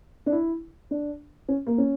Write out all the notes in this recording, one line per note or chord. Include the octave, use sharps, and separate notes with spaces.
D4
E4
D4
C#4
A#3
C#4